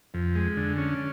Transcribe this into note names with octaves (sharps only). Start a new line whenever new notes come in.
F2
G#3
D3
C#4